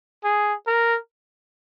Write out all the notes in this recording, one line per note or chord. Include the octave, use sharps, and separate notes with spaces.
G#4
A#4